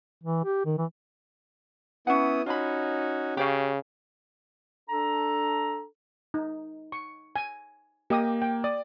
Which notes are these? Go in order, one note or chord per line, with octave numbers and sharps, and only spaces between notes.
E3
G4
D#3
E3
B3 C#4 E4 F#5 D#6
C#4 D#4 F4 F#4 B5
C#3 G4 C#5 F5
D4 A4 A#5
D#4
C#6
G#5
A#3 G4 D#5 D#6
G5
D5 D#6